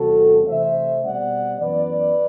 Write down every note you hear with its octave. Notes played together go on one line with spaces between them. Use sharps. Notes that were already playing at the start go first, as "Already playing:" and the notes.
Already playing: E2 C3 G3 C4 F#4 A4
C3 E3 A3 C4 C5 E5
B2 G3 C4 D5 F#5
F#2 E3 B3 B4 D5